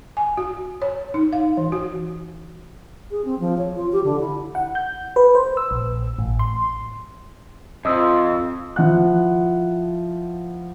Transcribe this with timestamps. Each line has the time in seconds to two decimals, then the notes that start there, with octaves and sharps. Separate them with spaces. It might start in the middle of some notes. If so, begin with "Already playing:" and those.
0.17 G#5
0.37 F#4
0.82 C#5
1.14 D#4
1.33 F5
1.57 E3
1.72 F#4
3.11 G#4
3.25 C4
3.40 F3
3.58 C#5
3.76 F4
3.92 G4
4.04 D3
4.20 E4
4.55 F#5
4.75 G6
5.16 B4
5.35 C5
5.57 E6
5.71 A#1
6.19 A1
6.39 C6
7.85 F2 F3 D#5 D#6 E6
8.76 F3 E4 F#5 F#6